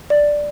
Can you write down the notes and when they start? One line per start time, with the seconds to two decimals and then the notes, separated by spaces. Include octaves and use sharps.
0.10 D5